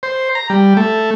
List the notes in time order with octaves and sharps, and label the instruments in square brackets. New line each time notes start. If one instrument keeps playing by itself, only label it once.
[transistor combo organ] C5
A#5
G3
A3